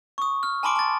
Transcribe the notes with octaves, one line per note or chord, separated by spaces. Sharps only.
C#6 D#6
F6
G#5 A5 B5 C6 D6 D7
A5 A6